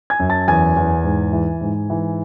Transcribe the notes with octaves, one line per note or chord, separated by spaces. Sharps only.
G#5 G#6
F#2
A5 A6
E2 G#5 G#6
E2
G#2
E3
G#2
E3